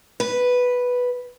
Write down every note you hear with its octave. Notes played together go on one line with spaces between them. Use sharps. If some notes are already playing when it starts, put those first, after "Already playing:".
B4